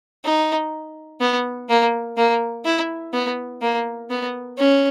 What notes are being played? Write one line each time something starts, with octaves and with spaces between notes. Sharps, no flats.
D#4
B3
A#3
A#3
E4
B3
A#3
B3
C#4